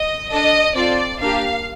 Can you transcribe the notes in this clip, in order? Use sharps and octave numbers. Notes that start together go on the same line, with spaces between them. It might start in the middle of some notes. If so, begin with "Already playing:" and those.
Already playing: D#5
D4 A4 D#5
C4 F4 A4 D5
A#3 D4 G4 F5